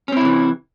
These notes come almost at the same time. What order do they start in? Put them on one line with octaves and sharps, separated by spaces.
C#4 C4 E4 C3 E3